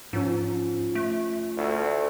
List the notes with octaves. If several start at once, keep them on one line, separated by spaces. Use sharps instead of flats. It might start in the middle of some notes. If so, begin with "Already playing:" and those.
G#2 F3 C#4
A3
D2